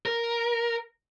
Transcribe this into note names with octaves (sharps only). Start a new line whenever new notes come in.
A#4